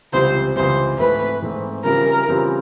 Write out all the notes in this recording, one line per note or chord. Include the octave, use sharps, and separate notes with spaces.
C#2 C3 E3 G3 C5
C#2 C3 E3 G3 C5
G#2 E3 A3 C4 B4
G#2 E3 A3 C4
C#3 E3 G3 C4 F4 A#4
C#3 E3 G3 C4 F4